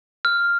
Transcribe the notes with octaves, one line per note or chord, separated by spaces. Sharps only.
F6